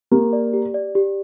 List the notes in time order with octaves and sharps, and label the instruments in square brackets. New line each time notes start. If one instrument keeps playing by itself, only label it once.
[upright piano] A#3 [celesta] G4
[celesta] D5
G4
D5
G4